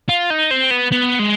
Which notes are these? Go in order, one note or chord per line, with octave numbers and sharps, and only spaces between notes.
F4
D#4
C4
B3
B3
G#3